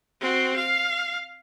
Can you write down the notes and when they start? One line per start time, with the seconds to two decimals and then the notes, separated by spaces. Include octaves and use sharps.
0.21 C4 F#4
0.56 F5